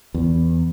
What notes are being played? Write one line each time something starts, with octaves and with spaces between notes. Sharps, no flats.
E2